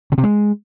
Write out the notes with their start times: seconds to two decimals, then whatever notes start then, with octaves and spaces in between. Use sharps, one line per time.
0.12 C#3
0.18 C3
0.24 G#3